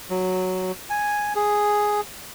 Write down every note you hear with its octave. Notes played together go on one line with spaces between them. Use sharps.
F#3
G#5
G#4